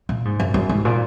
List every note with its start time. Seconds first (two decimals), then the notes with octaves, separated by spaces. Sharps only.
0.09 A#2
0.25 G#2
0.40 F#2
0.54 F#2
0.69 G#2
0.85 A#2